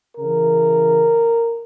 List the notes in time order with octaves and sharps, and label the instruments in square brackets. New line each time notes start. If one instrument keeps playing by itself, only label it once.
[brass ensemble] C#3 E3 A#4